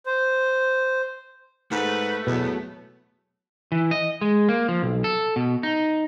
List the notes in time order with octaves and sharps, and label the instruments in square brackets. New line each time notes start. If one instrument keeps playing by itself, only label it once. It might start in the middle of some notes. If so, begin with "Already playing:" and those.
[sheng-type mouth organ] C5
[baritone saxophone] G#2 [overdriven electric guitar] A3 [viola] B4
[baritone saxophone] E2 [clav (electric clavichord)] B2 [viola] F#3 B3
[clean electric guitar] E3
D#5
G#3
A#3
F3
B1
A4
B2
D#4